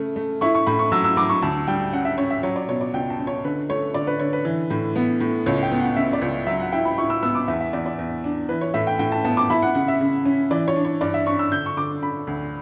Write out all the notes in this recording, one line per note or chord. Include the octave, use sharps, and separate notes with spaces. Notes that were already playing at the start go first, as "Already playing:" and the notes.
Already playing: C#3 A3
A3
E4 C#6
C#6
A2 B5
C#6
F#3 E6
E6
F#3 D6
C#6
D2 A5
G3 G5
C#4 F#5
E5
C#4 C#5
E5
F#3 C#5
D5
B2 C#5
D5
C#2 G5
A5
C#4
C#5
D3 B4
A3 C#5
D3 D5
B4
D3 C#5
B4
E3
A2
B3
A2
C#2 C#5
G5
B3
F#5
C#3 E5
D5
C#2
F#3 E5
F#5
E4 G5
B5
E4 C#6
E6
B3 E6
D6
E2 E5
E5
E2 D5
D5
E2
D4
E3 B4
C#5
A2 E5
G5
A2 G5
A5
B3 A5
D6
E4 B5
F#5
C#3 F#5
E5
C#3
C#4
E3 D5
C#5
D4
C#5
G2 D5
E5
D4 C#6
E6
D3 G6
C#6
D3 D6
D3 B5
D2